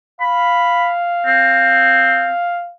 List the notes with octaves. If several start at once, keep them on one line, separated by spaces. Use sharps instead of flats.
F5 B5
C4